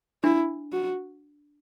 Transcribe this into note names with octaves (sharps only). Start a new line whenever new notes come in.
D4 E4
F#4